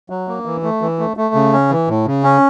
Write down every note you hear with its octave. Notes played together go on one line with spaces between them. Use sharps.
F#3
A#3
E3
A3
E3
A3
A3
C#3
C#4
E3
A2
C#3
C#4